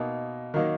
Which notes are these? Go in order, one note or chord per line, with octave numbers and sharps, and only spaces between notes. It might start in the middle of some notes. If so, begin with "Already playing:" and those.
Already playing: B2 A#3 D#4
D#3 F#3 A#3 D#4